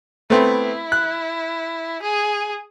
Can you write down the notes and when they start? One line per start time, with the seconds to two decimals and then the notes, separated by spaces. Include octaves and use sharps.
0.30 A3 B3 C4 E4
0.92 F#6
2.02 G#4